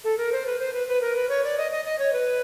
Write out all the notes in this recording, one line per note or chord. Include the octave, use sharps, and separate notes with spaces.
A4
A#4
C5
B4
C5
B4
B4
A#4
B4
C#5
D5
D#5
D#5
D#5
C#5
B4